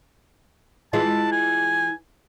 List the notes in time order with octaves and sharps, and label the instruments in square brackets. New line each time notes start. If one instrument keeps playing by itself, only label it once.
[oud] E3 G#3 F4 [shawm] A5
[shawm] G#5